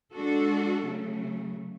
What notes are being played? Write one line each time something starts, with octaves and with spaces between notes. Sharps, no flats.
G#3 D4 F#4 A4
C#3 F#3 A3